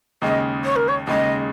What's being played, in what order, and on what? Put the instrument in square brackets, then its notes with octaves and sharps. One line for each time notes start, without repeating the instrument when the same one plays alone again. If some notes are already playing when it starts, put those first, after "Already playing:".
[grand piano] D#2 C#3 G#3 [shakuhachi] D#5
[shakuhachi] C#5
A#4
C#5
[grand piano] D#2 C#3 G#3 [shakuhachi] D#5